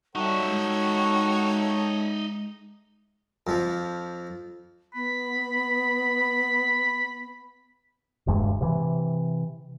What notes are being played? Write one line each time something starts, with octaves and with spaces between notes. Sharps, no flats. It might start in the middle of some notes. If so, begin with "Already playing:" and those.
G3 D#4 F#4 A4 C#5 E5 G5
G#3
F2 F3
B3 B5
E1 D2 G2 G#3
C3 E3